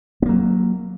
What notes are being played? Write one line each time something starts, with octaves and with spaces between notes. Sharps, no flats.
F#3 A#3 B3